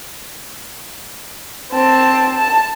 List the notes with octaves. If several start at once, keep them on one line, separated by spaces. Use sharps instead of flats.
C4 A5
A5